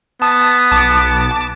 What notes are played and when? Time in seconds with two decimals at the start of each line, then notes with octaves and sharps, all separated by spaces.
0.22 B3 A5 D#6
0.72 B1 A5 D6